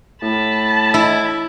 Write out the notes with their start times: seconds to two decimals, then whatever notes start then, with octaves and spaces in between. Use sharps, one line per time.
0.22 A2 A5 B5
0.94 E4